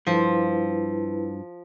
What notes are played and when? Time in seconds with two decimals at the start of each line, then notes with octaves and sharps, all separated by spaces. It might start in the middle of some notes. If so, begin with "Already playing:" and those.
0.07 G2 F3 E4 B4